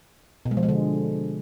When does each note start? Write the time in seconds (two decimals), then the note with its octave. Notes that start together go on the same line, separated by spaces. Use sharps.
0.45 B2
0.51 G#3
0.57 F3
0.63 G#3
0.69 D3